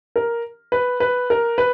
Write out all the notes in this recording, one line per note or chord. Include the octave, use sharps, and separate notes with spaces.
A#4
B4
B4
A#4
B4